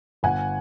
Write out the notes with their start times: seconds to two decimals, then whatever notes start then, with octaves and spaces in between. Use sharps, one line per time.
0.23 G1 F#5 G#5